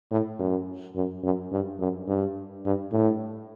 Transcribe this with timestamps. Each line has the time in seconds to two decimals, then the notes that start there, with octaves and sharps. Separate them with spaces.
0.11 A2
0.39 F#2
0.96 F#2
1.24 F#2
1.52 G2
1.80 F#2
2.08 G2
2.65 G2
2.92 A2